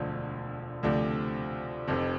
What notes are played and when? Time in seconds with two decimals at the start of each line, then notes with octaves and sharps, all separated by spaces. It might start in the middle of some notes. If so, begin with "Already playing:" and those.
Already playing: E1 D2 D3 F3
0.83 D2 C3 F3 A3 D4
1.87 F1 F2 C3